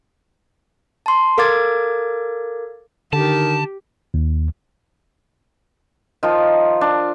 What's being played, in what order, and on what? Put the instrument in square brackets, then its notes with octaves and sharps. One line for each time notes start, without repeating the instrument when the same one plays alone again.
[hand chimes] A5 C6
A4 A#4 F5 D6 G#6 A6
[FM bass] D3 [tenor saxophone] D#3 [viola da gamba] G4 [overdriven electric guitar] A5
[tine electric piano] D#2
[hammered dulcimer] D#3 F3 F4
D4